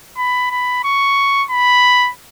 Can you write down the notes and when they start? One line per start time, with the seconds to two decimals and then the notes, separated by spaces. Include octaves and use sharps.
0.17 B5
0.51 B5
0.84 C#6
1.50 B5